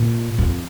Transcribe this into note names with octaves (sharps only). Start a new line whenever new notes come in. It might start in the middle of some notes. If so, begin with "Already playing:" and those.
Already playing: A#2
F2